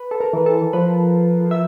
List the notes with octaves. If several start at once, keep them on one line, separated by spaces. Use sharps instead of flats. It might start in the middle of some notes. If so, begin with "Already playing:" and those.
Already playing: B4
A4
A#4
E3
A4
F3 B4
E5